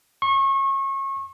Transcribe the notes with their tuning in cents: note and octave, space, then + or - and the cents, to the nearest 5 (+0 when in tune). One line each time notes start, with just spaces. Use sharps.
C#6 -30